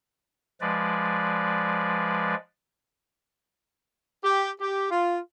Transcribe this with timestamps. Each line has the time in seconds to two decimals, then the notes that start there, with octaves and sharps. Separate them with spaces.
0.61 F3 G#3 B4 D5
4.24 G4
4.60 G4
4.91 F4